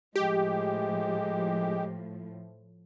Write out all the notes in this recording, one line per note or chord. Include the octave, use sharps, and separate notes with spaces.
A2 F3 G#3 G4